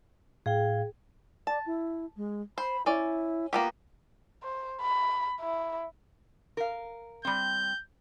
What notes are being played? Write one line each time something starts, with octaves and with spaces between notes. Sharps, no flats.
A2 G#4 F5 G5
D5 A5
E4
G#3
C5 B5
C#4 E4 D5
A#3 B3 F4 G4
C5
B5
E4
A#4 F5
G3 C4 G6